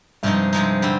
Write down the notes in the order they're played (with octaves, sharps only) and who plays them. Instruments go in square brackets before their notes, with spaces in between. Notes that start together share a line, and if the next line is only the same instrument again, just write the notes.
[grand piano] G2 [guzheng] C3 F3 G#3 D#4
[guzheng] C3 F3 G#3 D#4
D3 G3 C4